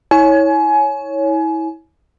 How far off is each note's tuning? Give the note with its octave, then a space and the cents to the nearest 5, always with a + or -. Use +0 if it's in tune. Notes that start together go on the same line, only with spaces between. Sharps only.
E4 -30 C#5 +0 G#5 +25